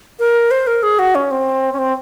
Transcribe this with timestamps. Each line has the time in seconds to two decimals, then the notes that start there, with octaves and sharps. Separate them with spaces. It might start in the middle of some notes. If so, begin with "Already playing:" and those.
0.19 A#4
0.51 C5
0.67 A#4
0.83 G#4
0.99 F#4
1.15 C#4
1.31 C4
1.73 C#4
1.78 C4